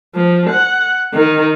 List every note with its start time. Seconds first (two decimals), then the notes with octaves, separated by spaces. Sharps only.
0.15 F3
0.50 F#5
1.14 D#3